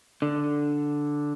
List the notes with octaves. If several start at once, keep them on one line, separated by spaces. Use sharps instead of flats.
D3